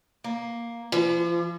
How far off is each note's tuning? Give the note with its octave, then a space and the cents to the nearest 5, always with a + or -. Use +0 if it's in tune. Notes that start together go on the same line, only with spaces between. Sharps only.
A#3 +5
F3 -40